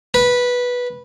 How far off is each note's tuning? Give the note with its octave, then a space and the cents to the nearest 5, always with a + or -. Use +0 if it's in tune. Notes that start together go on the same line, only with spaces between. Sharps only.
B4 -10